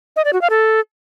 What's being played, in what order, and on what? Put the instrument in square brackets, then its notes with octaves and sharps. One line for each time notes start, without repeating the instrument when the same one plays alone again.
[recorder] D#5
D5
F#4
F5
A4